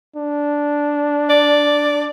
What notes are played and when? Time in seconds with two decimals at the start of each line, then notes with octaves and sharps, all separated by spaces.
0.16 D4
1.29 D5